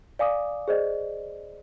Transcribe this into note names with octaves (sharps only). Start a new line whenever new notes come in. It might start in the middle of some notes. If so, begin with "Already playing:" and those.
D5 F5 G#5 D6 D#6
G#4 C5 D5 D#5